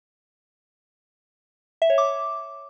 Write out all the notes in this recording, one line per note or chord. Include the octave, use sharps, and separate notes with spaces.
E5
C#5
D6